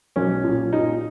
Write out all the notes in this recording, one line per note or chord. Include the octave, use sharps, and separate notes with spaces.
B1 C#4
A#2
A#2 D#4